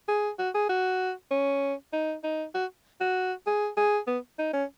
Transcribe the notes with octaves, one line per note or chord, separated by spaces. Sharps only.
G#4
F#4
G#4
F#4
C#4
D#4
D#4
F#4
F#4
G#4
G#4
B3
D#4
C#4